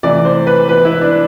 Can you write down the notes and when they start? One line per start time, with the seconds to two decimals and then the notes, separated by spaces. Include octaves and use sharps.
0.03 C3 E3 A3 D5
0.25 C5
0.47 B4
0.69 E3 B3 B4
0.85 E4
1.01 D4